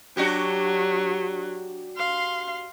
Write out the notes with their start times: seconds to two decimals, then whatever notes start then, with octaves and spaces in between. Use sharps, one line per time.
0.17 F#3 D4 F#4 G4
1.97 F5 C6